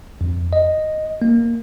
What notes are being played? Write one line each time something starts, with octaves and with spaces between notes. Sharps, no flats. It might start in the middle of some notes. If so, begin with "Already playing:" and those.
F2
D#5
A#3